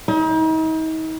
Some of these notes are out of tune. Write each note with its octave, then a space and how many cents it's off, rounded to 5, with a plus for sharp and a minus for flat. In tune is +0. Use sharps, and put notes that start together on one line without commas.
D#4 +40